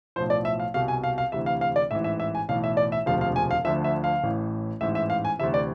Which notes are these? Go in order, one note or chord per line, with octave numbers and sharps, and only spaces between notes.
B1 A2 F3 C5
D5
E5
F5
C2 B2 F5
G#5
F5
F5
D2 C3 E3 E5
F5
F5
D5
A1 G#2 E3 E5
E5
E5
G#5
B1 A2 E3 F5
E5
D5
E5
E1 D2 C3 F3 F5
F5
G#5
F5
D2 D3 F3 E5
E5
F5
A1 A2 E3
A1 G#2 E3 E5
E5
F5
G#5
D2 C3 E3 E5
D5